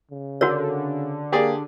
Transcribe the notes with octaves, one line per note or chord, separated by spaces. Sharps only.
C#3
D3 F#4 A#4 C#5
A#3 G4 G#4 D5